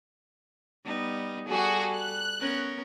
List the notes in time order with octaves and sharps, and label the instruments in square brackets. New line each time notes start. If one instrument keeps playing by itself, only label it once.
[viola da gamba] G3 B3 D#4
[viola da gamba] G3 A4 [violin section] F#4 G#4
[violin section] F#6
[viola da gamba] B3 C#4 A#4